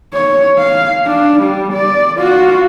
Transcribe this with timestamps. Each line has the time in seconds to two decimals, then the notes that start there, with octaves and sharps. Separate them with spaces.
0.14 C#5
0.58 F5
1.06 D4
1.42 G3
1.73 D5
2.18 F4 F#4